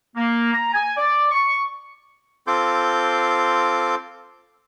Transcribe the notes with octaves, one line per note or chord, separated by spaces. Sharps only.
A#3
A#5
G#5
D5
C#6
C4 F4 A4 C6 D6 G6